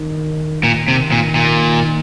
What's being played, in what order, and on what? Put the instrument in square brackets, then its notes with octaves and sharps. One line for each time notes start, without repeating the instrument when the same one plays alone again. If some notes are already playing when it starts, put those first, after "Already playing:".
Already playing: [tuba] D#3
[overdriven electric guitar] A#2 [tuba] D#3
[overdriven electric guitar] C3
A#2
A#2